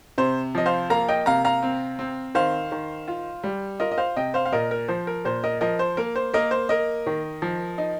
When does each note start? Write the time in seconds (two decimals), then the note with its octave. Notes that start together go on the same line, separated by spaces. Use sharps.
0.18 C3 C5
0.55 F3 D#5
0.66 C5 F5
0.90 A#3 F5 A#5
1.08 D#5 G5
1.26 C3 F5 A#5
1.45 F5 A#5
1.63 C4
1.99 C4
2.35 D#3 C5 F5
2.72 D#3
3.08 F4
3.43 G3
3.80 F4 A#4 D#5
3.92 D#5
3.98 C5 F5
4.16 C3 D#5 G5
4.34 C5 F5
4.45 F5
4.52 A#2 A#4 D#5
4.71 A#4
4.88 F3 C5
5.07 A#4
5.25 A#2 C5
5.44 A#4 D#5
5.61 F3 A#4 D#5
5.79 C5
5.97 A#3 A#4
6.16 C5
6.34 A#3 A#4 D#5
6.51 C5
6.69 A#3 A#4 D#5
7.06 D#3
7.42 F3
7.78 D#4